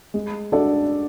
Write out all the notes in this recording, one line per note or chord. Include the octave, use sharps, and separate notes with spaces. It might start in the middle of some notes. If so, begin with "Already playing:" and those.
G#3
D4 F#4 A4 D5